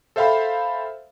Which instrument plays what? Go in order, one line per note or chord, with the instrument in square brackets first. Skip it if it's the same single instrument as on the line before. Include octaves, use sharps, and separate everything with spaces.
[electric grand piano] A4 C5 E5 F5 G5 B5